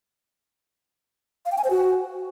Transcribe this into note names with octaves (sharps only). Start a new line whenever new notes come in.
F5
G5
G#5
C5
F#4